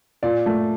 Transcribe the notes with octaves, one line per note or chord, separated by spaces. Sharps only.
A#2 D5
A3